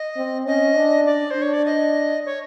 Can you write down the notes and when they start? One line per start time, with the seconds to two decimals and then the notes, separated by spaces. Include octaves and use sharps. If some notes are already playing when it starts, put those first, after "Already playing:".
Already playing: D#5
0.16 C4
0.46 C#4 D#5
0.76 D4
1.06 D5
1.31 C5
1.36 D4
1.42 C#5
1.53 D5
1.65 D#5
2.26 C#5